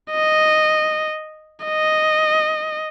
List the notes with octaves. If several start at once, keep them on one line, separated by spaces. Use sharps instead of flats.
D#5
D#5